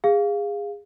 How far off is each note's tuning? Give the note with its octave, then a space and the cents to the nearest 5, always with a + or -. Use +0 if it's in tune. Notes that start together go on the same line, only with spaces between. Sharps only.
G#4 -20 F5 +0